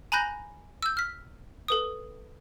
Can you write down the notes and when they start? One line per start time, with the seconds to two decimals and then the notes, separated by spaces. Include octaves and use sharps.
0.12 G#5 A#5 B5 F#6 G6 A#6
0.82 E6 G6
0.97 F6 B6
1.68 A4 B4 D#6